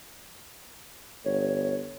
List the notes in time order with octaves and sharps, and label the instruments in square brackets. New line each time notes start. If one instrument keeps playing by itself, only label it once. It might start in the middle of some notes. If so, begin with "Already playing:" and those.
[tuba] G1 [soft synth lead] C#5